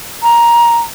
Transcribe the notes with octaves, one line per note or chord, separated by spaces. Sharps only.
A#5